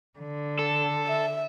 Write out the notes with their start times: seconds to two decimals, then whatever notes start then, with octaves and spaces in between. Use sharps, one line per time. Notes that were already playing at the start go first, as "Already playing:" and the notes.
0.19 D3
0.59 A4
1.07 E5